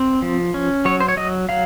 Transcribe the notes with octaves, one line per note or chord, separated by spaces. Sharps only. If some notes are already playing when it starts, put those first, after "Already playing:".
Already playing: C4
F3
C#4
F#3 C#5
C5
C#5
F#3 D#5
F#3 F5